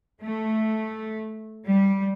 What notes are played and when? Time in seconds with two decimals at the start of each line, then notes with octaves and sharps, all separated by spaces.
0.20 A3
1.67 G3